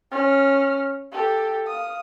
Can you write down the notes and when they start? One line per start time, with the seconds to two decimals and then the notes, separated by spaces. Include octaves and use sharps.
0.11 C#4 F6
1.12 G4 A4
1.67 F5 D#6